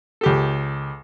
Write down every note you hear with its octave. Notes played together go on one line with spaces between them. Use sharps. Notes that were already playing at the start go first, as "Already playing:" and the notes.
C#2 G4 A4